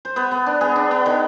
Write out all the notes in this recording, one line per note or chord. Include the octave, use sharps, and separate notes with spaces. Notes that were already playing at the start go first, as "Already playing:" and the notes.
C5
B3 B4
B3
D4
B3 G#4
D4
B3
D#3